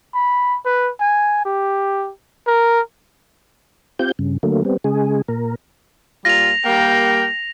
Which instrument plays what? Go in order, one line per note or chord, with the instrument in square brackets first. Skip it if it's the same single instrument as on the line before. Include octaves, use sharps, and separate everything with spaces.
[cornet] B5
B4
G#5
G4
A#4
[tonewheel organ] C4 F4 G4 G6
G2 C#3
D3 F#3 A3 A#3
G3 B3 C4
C#3 G#3 G#4
A#2 A#4
[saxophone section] A#2 G3 F4 [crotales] A#6 F7
[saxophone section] G3 A#3 [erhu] G5